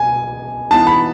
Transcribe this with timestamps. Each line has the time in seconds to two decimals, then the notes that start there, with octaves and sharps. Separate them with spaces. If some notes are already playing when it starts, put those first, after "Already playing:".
Already playing: B2 G#5
0.71 E3 B3 D#4 A5
0.87 B5